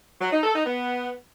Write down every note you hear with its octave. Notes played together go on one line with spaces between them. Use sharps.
F#3
D#4
A4
D#4
B3